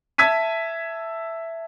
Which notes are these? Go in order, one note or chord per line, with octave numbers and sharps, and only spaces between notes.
E5 A5 E6 G#6 B6 D#7